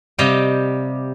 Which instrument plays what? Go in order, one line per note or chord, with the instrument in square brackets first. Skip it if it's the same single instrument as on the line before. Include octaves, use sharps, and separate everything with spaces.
[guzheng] C3 G3 G4 D#5 F5 G5